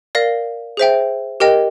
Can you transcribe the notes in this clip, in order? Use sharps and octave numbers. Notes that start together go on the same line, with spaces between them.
A#4 D5 F5 A#6
G#4 C5 E5 G5
G4 A#4 D#5 G5